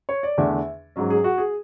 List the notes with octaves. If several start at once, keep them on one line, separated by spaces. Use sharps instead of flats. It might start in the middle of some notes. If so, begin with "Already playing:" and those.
C#5
D5
E2 D3 A3 D4 E5
G#2 F#3 C#4
G#4
F#4
G#4